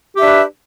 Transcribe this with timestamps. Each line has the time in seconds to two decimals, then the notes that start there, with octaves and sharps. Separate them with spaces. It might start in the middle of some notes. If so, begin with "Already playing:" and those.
0.16 G4
0.19 E5
0.22 D4
0.25 B4